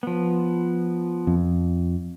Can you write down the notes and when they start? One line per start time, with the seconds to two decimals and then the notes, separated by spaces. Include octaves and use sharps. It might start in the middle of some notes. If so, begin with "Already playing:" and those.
0.03 F3 B3
1.27 F2